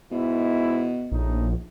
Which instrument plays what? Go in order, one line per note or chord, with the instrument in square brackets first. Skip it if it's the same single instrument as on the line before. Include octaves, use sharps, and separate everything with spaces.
[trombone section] G#2 E4 [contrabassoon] B2
[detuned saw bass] A#1 [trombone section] A2 D#4